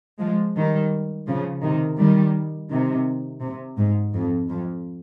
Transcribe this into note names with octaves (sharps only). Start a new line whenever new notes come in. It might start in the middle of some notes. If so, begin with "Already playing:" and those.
F3 G#3
D#3 G3
C#3 F3
C3 D#3
D#3 G3
C3 D#3
C3
G#2
F2
F2